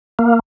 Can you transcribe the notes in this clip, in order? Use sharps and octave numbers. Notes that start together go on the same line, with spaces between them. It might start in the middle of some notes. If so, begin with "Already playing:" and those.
A#3